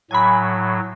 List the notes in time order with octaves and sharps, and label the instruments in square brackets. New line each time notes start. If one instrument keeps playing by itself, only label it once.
[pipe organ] A2 F#3 [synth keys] G#5 B5